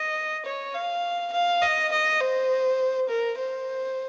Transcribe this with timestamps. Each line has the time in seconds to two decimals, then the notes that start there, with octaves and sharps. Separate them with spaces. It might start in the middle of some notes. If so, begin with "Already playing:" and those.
Already playing: D#5
0.45 C#5
0.74 F5
1.33 F5
1.62 D#5
1.92 D#5
2.21 C5
3.09 A#4
3.38 C5